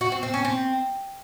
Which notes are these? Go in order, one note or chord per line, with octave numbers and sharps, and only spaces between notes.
F#4
C4
C4
C#4
C4